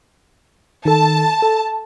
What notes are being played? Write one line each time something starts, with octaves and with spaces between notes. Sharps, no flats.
D#3 A4 A5
A4